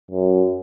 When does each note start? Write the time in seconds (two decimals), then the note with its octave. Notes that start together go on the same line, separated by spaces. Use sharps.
0.11 F#2